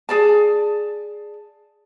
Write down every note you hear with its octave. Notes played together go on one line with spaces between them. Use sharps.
G#4 D5 A5